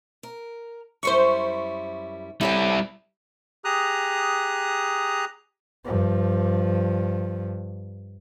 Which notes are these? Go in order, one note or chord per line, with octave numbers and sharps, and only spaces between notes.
A#4
F#2 G3 E4 C5 C#6
G3 E4 A4 C#5 G5
G4 G#4 A#5 D#6 F#6
G2 F3